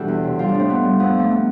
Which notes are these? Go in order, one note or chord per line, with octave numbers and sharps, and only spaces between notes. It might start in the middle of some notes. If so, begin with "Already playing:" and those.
Already playing: B2 E3 G3 D4 G4 A4
E2
C3
G3 F4
D4
A2
C4
A2 B3
G3
F2 B3
F3 A3
B3